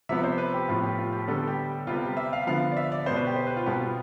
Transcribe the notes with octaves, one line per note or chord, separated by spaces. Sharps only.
C3 F3 B3 E5
C5
B4
G4
A2 F3 B3 F4
G4
F4
G4
D3 G3 B3 A4
G4
C3 G3 B3 F4
G4
E5
F5
D3 F3 B3 F5
D5
E5
D5
B2 B3 C5
B4
G4
C5
B4
F4
B2 G3 B3 G4
F4